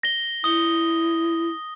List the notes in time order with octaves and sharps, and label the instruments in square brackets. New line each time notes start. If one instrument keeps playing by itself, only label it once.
[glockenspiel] A#6 G7
[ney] E4 [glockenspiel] D#6 G7